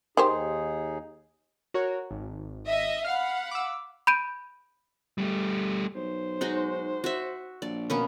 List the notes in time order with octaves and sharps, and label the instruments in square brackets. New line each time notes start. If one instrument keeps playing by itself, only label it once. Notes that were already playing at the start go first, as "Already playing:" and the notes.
[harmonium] D#2 D#4 G#4 [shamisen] D#3 G4 C5
[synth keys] F#4 A#4 C#5
G#1
[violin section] D#5 E5
[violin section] F5 F#5 B5 [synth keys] F6 C7
[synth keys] D6 E6
[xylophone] B5 G6 D7 D#7
[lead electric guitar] G3 A3
[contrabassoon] B1 [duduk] C5
[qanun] G#3 D#4 F#4
F#4 E5
[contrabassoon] A#1 [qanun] D5
[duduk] B2 [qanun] A#3 B3 C#4